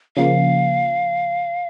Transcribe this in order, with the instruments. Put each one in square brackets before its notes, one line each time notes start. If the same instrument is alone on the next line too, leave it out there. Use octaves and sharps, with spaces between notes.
[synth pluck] C#3 F3 A#3 [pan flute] F5